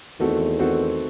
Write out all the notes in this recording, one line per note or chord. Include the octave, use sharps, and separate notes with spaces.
E2 D#3 A3 C4 F#4 A4
D#3 A3 C4 F#4 A4